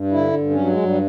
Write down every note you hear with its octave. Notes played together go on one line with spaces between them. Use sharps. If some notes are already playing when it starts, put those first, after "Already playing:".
Already playing: G2
D3 E4
G2
C#4
F#3
G#3
G2
G3